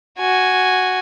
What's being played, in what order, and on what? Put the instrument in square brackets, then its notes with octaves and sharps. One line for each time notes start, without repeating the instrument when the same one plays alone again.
[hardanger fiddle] F#4 G#5